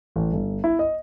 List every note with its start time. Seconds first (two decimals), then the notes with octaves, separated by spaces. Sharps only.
0.16 A1
0.33 G1
0.64 E4
0.79 D#5